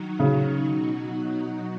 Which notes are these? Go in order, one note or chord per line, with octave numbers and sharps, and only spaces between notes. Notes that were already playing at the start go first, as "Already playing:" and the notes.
Already playing: D#3 F#3 D#4 F#4
C#3
B2 F#3 D#4 F#4